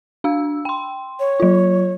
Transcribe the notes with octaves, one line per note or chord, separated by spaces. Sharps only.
D4 F5 E6
G5 C6
C#5
F#3 F4